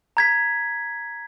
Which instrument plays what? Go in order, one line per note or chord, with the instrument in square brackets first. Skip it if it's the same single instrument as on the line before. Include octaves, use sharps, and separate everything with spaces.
[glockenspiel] A#5 G#6 B6